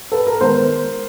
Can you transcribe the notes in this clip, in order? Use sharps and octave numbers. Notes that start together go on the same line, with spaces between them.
A4 B4
A#4
D#3 G#3 B3 A#4 C5